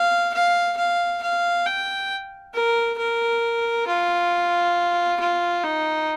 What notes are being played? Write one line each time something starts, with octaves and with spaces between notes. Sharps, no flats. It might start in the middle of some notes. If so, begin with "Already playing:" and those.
Already playing: F5
F5
F5
F5
G5
A#4
A#4
F4
F4
D#4